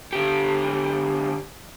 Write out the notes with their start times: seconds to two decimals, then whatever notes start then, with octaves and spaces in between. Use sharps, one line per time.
0.13 D3 G4